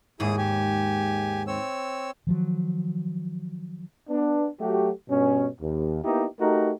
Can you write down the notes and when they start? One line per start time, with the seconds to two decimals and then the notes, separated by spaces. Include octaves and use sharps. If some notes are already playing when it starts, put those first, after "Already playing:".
0.20 D#2 G#2 E4 G#4 D#6
0.38 G4 G#5
1.47 C4 C#5 E6
2.27 D#3 F3 F#3
4.09 B3 D4
4.60 F#3 A3 F#4 G4
5.09 G2 B2 C#4
5.61 D#2
6.04 A#3 B3 D#4 E4 G4
6.41 A3 D#4 F#4 G4 A#4